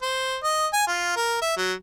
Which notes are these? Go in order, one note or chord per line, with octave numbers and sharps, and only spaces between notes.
C5
D#5
G#5
F4
A#4
E5
F#3